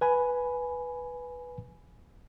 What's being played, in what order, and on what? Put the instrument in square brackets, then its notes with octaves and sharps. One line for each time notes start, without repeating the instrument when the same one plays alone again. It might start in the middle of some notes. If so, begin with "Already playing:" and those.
[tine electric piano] B4 G#5 B5